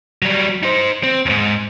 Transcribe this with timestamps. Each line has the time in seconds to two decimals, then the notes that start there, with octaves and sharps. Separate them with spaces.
0.22 F#3 G3
0.63 D#4 C5
1.03 C4
1.26 D#2 G#2